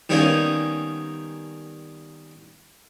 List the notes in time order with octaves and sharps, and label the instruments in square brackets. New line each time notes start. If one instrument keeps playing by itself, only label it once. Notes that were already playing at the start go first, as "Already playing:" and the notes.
[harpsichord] D#3 G3 A#3 B3 C#4 D#4